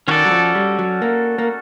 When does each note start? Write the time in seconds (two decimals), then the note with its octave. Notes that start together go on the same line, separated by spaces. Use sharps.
0.08 D#3 C#4 F#4 A4 D5
0.25 F#3
0.31 F3
0.55 G3
0.79 F#3
1.02 A#3
1.38 A#3